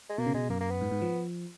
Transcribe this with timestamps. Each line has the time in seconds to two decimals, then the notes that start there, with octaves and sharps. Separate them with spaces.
0.09 G#3
0.18 B2 A#3
0.26 C#3
0.34 B2 G#3
0.50 F#2 A#3
0.60 A#3
0.71 B3
0.81 G#2
0.91 G#2
1.02 F3